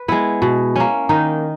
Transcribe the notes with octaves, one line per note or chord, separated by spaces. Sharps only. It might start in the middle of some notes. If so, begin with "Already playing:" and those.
Already playing: B4
G#3 B3 E4
B2
A#3 C#4
D#3 D#4